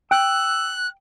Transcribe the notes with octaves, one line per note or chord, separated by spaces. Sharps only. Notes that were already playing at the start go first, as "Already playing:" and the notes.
G5 E6 F#6